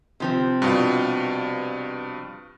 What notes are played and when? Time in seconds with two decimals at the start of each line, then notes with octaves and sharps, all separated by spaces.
0.20 C3 F3 C4
0.62 G2 B2 F4